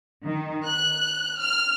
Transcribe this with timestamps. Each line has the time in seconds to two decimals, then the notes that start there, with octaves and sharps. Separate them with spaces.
0.25 D#3
0.66 F#6
1.40 F6